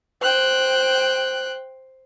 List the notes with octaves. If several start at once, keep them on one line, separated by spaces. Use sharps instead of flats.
C5 G5 F#6